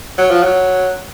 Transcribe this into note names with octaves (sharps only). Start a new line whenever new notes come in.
F#3
F3
F#3